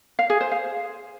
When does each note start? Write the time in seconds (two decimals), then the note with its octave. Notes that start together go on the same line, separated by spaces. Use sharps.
0.19 F5
0.30 G#4
0.41 C5
0.52 F5